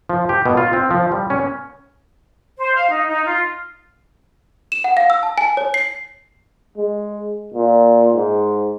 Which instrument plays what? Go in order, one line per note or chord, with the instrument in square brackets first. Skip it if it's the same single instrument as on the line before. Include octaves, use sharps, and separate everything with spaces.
[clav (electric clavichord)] F3
G4
B2
F4
C4
F3
G3
C#4
[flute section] C5
F5
D#4
D#4
F4
[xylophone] E7
F#5
F5
E6
A5
G#5
C#5
C7
[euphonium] G#3
A#2
G#2